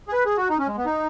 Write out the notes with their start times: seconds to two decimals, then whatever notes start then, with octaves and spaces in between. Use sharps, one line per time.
0.08 G#4
0.13 B4
0.26 G#4
0.37 F#4
0.50 D#4
0.59 C#4
0.68 G#3
0.78 B3
0.86 D#4